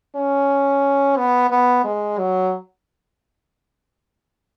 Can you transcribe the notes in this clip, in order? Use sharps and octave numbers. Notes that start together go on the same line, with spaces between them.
C#4
B3
B3
G#3
F#3